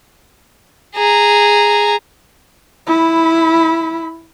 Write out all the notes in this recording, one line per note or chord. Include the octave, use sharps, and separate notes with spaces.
G#4 A#5
E4 B5